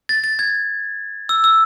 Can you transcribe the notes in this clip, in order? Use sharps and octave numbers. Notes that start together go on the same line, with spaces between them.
A6
A6
G#6
E6
E6